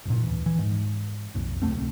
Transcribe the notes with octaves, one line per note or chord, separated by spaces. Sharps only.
G1 F2 A#2
D1 E3
E3
G#2
B1 F2
D1 C2 A3 C4